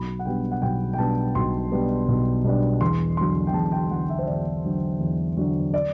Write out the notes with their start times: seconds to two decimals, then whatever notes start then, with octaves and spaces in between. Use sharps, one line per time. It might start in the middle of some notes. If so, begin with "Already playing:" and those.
Already playing: B1 B5
0.19 F#5
0.25 B2 G3 B3 D4 G5
0.51 F#5
0.62 B1 G5
0.93 G5
0.98 B2 G3 B3 D4 A5
1.35 B1 C6
1.72 B2 G3 B3 D4
2.08 B1
2.44 B2 G3 B3 D4
2.81 E2 C6
3.17 D3 F#3 C6
3.47 G5
3.54 E2 A5
3.65 A5
3.72 G5
3.90 D3 F#3 F#5
4.10 E5
4.19 C5
4.27 E2 D5
4.64 D3 F#3
5.00 E2
5.37 D3 F#3
5.74 D5